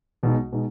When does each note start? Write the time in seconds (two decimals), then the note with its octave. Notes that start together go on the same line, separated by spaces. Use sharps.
0.23 B1 B2 G#3 D#4
0.52 B2 G#3 D#4